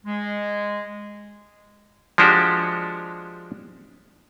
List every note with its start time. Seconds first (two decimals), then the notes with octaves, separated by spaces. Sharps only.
0.06 G#3
2.18 F3 G#3 D4 F#4 G4